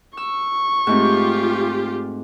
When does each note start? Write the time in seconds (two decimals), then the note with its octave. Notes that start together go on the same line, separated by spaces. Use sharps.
0.17 C#6 E6
0.87 G#2 A3 C4 F4 G4